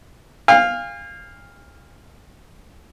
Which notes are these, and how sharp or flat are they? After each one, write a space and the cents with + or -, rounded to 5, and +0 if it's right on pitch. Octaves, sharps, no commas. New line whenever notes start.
F5 +0 G#5 -45